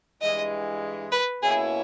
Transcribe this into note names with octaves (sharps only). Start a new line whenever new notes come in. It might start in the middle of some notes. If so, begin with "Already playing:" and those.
G2 E3 G#3 D#5
B4
B2 A#3 C#4 E4 G#4